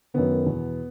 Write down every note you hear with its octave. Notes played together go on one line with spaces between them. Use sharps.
F#2 D#3 B3
E2 B2